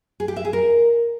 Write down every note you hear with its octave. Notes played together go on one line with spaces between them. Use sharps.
G#4
G4
E5
G#4
A#4